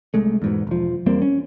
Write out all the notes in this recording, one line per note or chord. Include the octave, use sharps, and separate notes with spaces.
C2 G#3 A3
E2 G#2 B2
E1 F3
E2 G3 A#3 C4
C#4